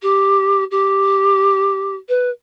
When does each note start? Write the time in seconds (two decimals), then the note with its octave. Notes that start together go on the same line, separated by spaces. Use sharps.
0.02 G4
0.71 G4
2.09 B4